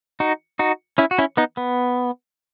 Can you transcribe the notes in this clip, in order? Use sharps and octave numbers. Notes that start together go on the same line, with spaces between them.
D#4 F#4
D#4 F#4
C#4 E4
F#4
C#4 E4
B3 D#4
B3